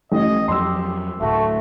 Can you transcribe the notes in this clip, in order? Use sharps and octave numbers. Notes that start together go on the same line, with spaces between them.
A1 D#5
F2 F3 F#3 G4 C6 E6
D1 D2 A2 A3 F#4